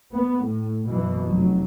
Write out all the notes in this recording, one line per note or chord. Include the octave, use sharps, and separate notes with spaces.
B3
A2
F#2 B2 E3
F1 F#3